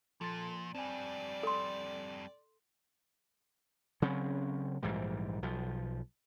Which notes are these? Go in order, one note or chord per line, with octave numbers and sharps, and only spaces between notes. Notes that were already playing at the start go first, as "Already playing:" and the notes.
A#2 F3 A4 C6 A6
F2 G3 C4 D5 G#5
A4 C6
C#3 F#3 C4 C#4
A#1 G#2 E3 G3
B1 F3